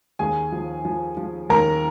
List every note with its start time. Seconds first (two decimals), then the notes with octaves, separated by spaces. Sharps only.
0.19 D#2 G#4 G#5
0.52 F3
0.85 F3
1.17 F3
1.50 D#2 A#4 A#5